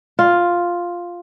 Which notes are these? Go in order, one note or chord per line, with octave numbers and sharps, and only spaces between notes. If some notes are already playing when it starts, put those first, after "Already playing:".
F4